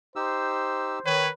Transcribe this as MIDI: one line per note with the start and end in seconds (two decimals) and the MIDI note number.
0.16 0.99 63
0.16 0.99 67
0.16 1.19 72
0.16 0.99 88
1.06 1.28 51
1.06 1.30 71
1.06 1.28 73